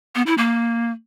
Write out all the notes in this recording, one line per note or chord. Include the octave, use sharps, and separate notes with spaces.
B3
E4
A#3